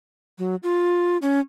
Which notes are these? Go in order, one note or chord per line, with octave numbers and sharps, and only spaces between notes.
F#3
F4
C#4